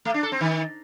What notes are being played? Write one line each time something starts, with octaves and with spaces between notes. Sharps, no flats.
A3
D4
A4
C4
D#3